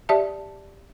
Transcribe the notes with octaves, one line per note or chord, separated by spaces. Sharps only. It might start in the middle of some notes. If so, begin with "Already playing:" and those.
G4 D5 E5 A5